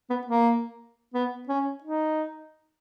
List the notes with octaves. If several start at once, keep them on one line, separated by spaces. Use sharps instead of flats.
B3
A#3
B3
C#4
D#4